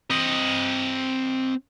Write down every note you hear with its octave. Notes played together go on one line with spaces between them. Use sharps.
C4 D#5